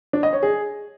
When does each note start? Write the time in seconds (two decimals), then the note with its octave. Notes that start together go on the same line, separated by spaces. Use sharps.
0.13 D4
0.23 D#5
0.33 C#5
0.43 G#4